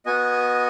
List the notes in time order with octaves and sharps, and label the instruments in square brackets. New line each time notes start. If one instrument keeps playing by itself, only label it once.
[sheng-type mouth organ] B3 F#4 D#5 G#5